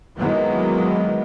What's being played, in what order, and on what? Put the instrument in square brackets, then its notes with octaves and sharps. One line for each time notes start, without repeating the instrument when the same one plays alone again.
[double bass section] D#3 E3 F#3 G#3 A#3 B3